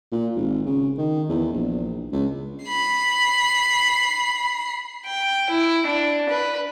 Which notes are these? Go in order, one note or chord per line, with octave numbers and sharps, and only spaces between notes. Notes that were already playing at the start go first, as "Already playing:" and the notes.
A#2
G#1
C#3
D#3
E2
A#1
C#2
B5 C7
G5
E4
D4
B4